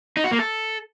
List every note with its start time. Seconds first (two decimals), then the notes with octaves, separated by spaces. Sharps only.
0.17 D#4
0.24 F#4
0.31 A#3
0.39 A4